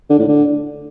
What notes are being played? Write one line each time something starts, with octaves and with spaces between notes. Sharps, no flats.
D3
A2
D3